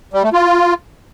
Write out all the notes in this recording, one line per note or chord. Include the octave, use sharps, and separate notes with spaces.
G3
A3
F4